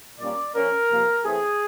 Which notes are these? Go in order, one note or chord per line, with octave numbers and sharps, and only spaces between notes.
A#2 G3 A#3 C#4 D5
F3 A#3 C#4 A#4
C3 F3 A#3
E3 A3 C4 G#4